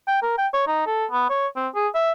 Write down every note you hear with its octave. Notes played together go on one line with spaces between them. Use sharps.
G5
A#4
G5
C#5
D#4
A4
B3
C#5
C4
G#4
E5